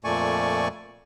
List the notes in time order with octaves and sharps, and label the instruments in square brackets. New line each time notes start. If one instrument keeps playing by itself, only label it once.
[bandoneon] F2 A#2 A3 D5 G#5 C#6